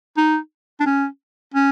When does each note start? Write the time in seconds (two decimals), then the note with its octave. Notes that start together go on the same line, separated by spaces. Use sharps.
0.17 D#4
0.80 D4
0.86 C#4
1.54 C#4